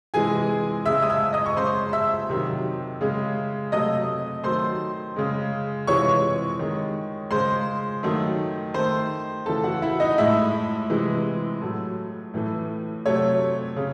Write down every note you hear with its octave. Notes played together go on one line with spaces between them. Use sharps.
C3 E3 G#3 G#4 G#5
C#3 G#3 E5 E6
D#6
E5 E6
D#5 D#6
C#6
C#3 G#3 C5 C6
E5 E6
C3 D#3 F#3
C#3 G#3
C3 F#3 A3 D#5 D#6
D#3 F#3 A3 C5 C6
C#3 G#3
C3 E3 G#3 C#5 C#6
D#3 G#3
C#3 G#3 C5 C6
D#3 F#3 A3
D#3 A3 C5 C6
C#3 E3 A3 A4 A5
F#4 F#5
E4 E5
D#4 D#5
A2 G#3 E4 E5
C3 E3 G#3
A2 F#3 A3
A2 E3 A3
C3 F#3 A3 C#5
C#3